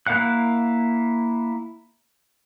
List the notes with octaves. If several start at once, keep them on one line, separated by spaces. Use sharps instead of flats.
A#3 E4 F5 F#5 F#6